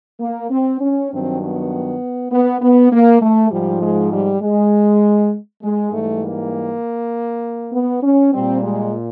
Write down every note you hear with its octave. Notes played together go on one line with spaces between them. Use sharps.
A#3
C4
C#4
G2 D#3 F#3 C4
B3
B3
B3
A#3
A3
G#2 F3 G3
G#3
G3
G#3
G#3
G#2 E3 G3 A3
A#3
B3
C#4
A#2 G3 C4
G#3